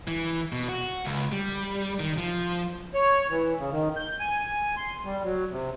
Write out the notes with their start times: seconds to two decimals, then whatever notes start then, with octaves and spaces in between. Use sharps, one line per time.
0.08 E3
0.52 B2
0.69 F#4
1.05 C#2
1.32 G3
2.00 D#3
2.18 F3
2.94 C#5
3.30 E3
3.59 C#3
3.72 D#3
3.97 G6
4.20 G#5
4.77 C6
5.05 G3
5.24 F#3
5.51 C3